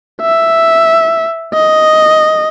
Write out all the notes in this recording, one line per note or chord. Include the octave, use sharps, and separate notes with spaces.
E5
D#5